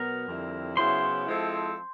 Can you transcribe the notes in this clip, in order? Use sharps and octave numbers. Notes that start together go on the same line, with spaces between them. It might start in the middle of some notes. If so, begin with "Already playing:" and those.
Already playing: B2 F#3 B3 A#4 A#5
F2 D3 G3 C4 E4
C#3 F#3 B3 E4 C5 C6
F3 G#3 C4 E4 A4